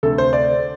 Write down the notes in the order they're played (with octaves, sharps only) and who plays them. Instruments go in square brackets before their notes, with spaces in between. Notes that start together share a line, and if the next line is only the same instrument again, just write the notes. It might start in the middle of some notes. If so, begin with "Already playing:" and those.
[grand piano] D2 C3 A3 A4
C5
D5